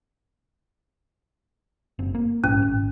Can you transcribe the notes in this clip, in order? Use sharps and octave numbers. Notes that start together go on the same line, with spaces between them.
F#1 C4
A#3
A#1 G#2 C#4
G#1